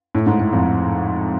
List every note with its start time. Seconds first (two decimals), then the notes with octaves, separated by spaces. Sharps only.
0.15 A2
0.26 G#2
0.40 A2
0.53 F2